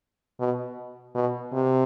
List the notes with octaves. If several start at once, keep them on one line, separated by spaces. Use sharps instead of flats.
B2
B2
C3